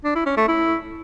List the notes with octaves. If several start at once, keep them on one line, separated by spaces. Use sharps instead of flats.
D4
E4
C#4
A3
E4